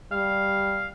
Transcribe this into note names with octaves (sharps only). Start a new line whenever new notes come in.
G3 F5